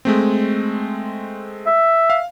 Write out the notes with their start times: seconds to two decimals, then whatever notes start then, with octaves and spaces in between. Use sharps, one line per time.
0.05 G#3 A3 C4
1.67 E5
2.10 F5